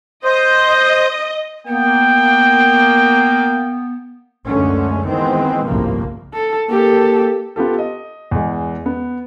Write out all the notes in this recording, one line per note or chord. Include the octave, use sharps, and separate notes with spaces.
C5 D#5
A#3 B3 G5
C#2 F#2 D3 G#3 A3 C#4
D#3 E3 G#3 B3 C4
G1 C2 A2 C#3 F3 A#3
A4
A#3 G4 A4
B3 F4 G4 A4
D#5
E2 G#3
B3